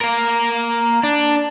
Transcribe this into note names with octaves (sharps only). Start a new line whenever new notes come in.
A#3 A#4
D4